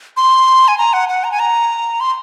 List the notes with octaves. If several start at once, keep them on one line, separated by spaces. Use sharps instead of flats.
C6
G#5
A#5
F#5
F#5
A#5
G#5
A#5
C6